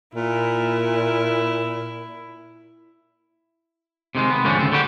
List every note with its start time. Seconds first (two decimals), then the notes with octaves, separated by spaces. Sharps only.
0.15 A#2 E4
4.15 C3 D#3 G#3
4.30 B3
4.44 D2 G#2 D#3 F3 C#4 D4
4.59 D2 C#3 C4
4.72 D3 G3 F#4 G4